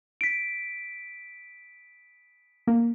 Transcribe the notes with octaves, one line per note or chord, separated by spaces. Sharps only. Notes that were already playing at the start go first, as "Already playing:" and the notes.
B6 D7
A#3